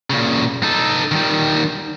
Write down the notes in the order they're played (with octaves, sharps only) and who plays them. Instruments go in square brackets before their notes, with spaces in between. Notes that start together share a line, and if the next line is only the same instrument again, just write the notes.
[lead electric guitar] A#2 C#3
D#4 A4
D#3 G3